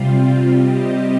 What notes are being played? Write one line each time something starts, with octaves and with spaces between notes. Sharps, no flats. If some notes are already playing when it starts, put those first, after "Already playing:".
Already playing: C3 G3 C4 F4
C3 G3 C4 G4 D#5